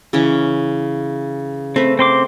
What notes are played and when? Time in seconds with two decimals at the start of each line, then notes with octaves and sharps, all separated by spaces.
0.13 C#3 E3 C#4
1.76 A3 C4 B4
1.99 C4 C6 D6